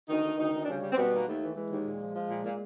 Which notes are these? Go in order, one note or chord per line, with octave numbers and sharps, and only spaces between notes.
D2 D#3 D#4
D2
D2 D#3 D#4
D2
D4
C#3 G3 C#4
G3
C4
B2 G3 B3
D#2 A#3
D#2 A3
E3
E3 G#3
D#2
A#2
F3
F3
A#2
A#2